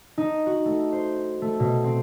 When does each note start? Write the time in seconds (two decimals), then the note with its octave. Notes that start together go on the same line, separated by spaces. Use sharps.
0.18 D#4
0.47 F#4
0.65 A3
0.93 C5
1.42 A3
1.60 B2
1.84 C4